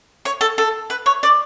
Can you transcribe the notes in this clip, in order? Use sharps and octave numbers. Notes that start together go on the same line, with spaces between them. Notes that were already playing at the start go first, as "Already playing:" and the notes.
C#5
A4
A4
B4
C#5
D5